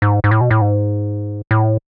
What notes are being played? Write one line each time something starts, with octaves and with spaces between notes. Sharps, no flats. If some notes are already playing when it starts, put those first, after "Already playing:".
G#2
G#2
A2
B2
A2
G#2
A2